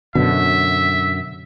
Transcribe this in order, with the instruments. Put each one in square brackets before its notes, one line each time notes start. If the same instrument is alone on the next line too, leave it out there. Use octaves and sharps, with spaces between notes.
[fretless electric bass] F#2 D3 [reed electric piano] B2 [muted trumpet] E5